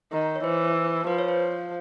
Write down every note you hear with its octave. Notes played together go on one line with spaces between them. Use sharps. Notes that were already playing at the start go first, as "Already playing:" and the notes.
D#3
C#5
E3 C5
F3 B4
C#5
C5